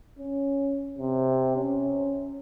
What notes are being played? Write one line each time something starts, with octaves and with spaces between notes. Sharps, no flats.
C#4
C3
C#4